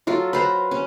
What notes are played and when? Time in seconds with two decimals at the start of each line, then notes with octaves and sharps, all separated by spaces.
0.07 F#3 F4 A4
0.33 B4 C5 A#5
0.71 C#4